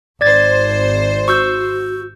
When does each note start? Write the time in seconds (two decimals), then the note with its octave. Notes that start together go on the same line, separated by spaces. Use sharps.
0.21 G#1 C5 D5 G#6 A6
1.28 F#4 C#6 E6 G6